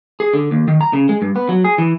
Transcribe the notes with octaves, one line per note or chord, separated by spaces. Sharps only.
G#4
D3
D#2
D#3
A#5
C#3
G#3
G2
B3
F#3
G#4
E3